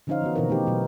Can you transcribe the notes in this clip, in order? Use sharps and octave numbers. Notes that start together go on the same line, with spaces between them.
D3 F3 C#4 D#4 C5 F5
E3 B3 F#4
B2 D#3 E3 C4 E4 A#4
A3 D#4 G4
B2 F#3 B3